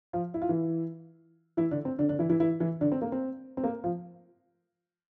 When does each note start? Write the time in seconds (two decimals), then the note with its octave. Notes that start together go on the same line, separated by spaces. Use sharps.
0.13 F3 F4
0.34 E4
0.42 F4
0.49 E3 E4
1.57 E3 E4
1.71 D3 D4
1.85 C4
1.99 D3 D4
2.09 D3 D4
2.19 E3 E4
2.29 E3 E4
2.40 E3 E4
2.60 E3 E4
2.81 D3 D4
2.92 C4
3.02 A#3
3.12 C4
3.57 C4
3.63 A#3
3.84 F3 F4